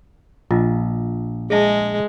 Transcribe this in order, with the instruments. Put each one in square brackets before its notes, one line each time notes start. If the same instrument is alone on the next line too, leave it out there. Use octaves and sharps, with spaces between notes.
[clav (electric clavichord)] A#1 [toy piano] F4 D#5
[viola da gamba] G#3 [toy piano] G#4 E5 A5